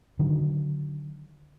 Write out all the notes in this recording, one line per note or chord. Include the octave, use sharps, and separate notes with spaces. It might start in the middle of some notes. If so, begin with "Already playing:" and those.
D3 D#3 F#3